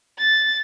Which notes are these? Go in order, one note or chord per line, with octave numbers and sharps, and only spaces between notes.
A6